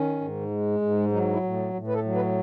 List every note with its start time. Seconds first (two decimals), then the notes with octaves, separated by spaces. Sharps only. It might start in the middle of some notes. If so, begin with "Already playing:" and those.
Already playing: D#3 C#4
0.21 G#2
0.51 G#3
0.82 G#2
1.12 F#3 D#4
1.32 E4
1.43 A2
1.74 A2
1.87 B4
1.94 A4
2.04 F#3
2.15 B4